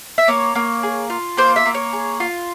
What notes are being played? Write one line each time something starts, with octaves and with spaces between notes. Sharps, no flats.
E5
A#3 C#5
A#3
G#4
F4
A#3 C5
E5
A#3
C#5
G#4
F4